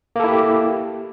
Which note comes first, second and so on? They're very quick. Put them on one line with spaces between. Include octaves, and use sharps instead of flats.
A#3 A4 E4 G4